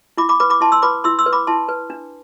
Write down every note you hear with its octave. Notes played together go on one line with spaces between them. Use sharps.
E4 B5 D6
B5 D6
B4 B5 D6
B5 D6
E4 A5 C6
C6 E6
B4 B5 D6
E4 C6 E6
C6 E6
B4
B5 D6
E4 A5 C6
B4
D4